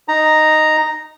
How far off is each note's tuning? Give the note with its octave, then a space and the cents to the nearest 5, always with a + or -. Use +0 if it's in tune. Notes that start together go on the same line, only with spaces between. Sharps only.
D#4 -5 A#5 +0